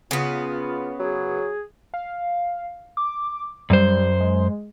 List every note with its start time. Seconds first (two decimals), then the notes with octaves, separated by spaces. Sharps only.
0.11 C#3 B3 F4
1.00 F#3 G#4
1.94 F5
2.97 D6
3.70 F#2 G3 C5
4.20 G#3